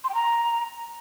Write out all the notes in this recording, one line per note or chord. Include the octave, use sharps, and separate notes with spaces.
C6
G5
A#5